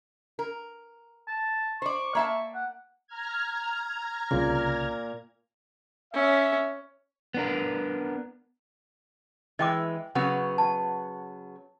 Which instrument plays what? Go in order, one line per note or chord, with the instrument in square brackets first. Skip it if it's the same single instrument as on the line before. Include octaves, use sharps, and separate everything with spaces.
[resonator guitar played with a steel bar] A#4
[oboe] A5
[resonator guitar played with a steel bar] C5 D5 [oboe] C#6
[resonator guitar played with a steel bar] A#3 E5 A5
[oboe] F#5
[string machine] A#5 F6 G#6
[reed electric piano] C2 C#3 [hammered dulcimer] A#2
[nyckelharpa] C#4 [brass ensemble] E5
[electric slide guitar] B3 D4 A#4
[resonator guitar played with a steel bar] E3 G#3 [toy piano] D#5 G5 D6
[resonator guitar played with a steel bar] C#3 F#3 B3 [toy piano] F#5
[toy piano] A5